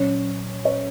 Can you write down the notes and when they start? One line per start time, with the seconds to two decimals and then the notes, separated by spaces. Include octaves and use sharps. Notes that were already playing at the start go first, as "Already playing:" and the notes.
Already playing: A#2 F#3 C#4 C#5
0.65 C#5